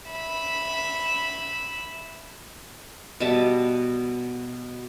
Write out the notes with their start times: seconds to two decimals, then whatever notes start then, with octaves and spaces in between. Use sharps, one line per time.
0.11 E5 B5
3.20 B2 G3 E5 A5